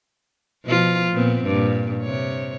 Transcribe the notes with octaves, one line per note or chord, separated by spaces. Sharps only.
B2 F3 F4
A#2 B3 C4
G2 A#2
C3 C#5